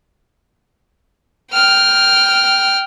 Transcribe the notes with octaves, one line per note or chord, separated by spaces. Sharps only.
G5 F6